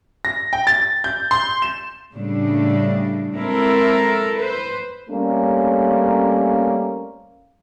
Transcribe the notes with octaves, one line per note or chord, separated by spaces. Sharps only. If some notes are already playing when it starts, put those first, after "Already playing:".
A#6
G5
A6
G6
C6
E7
A2 C#3 G3 A3 D4
G#3 C4 E4 A4 A#4
B4 C5
G3 A3 A#3 C4 C#4